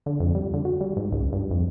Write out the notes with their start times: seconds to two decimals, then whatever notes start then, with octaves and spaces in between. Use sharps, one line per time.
0.06 D3
0.20 F2
0.35 G3
0.54 D3
0.65 F#4
0.81 G3
0.97 G#2
1.12 C#2
1.32 G2
1.51 F2